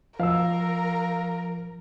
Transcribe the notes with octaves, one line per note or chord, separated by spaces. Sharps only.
F3 A#4 F5 E6